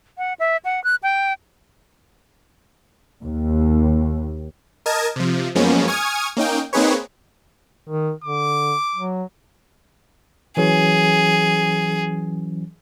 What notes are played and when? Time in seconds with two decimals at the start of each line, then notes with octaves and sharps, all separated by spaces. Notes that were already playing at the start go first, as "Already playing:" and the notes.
0.18 F#5
0.40 E5
0.65 F#5
0.84 F#6
1.03 G5
3.23 D#2
4.86 A#4 D#5 A5 G#6
5.16 C3 F3
5.55 F#2 F3 G#3 A#3 B3 C#4
5.88 G#5 C#6 D#6 F6 G#6
6.37 A#3 C#4 D#4 G5
6.73 A#3 C4 D#4 G#4 B4 C#5
7.89 D#3
8.24 D3 D6
8.95 F#3
10.57 E3 F#3 C#4 G#4